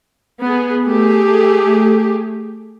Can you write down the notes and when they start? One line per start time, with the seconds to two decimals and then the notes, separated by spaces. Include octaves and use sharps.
0.41 B3 G#4
0.85 A3 G4 G#4